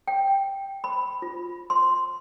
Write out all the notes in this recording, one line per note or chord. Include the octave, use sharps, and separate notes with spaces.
G5
B5
F4
C6